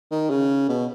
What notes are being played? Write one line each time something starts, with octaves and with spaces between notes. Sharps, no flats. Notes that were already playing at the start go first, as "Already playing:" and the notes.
D#3
C#3
B2